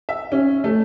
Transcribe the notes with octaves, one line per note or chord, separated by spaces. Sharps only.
E5
C#4
A3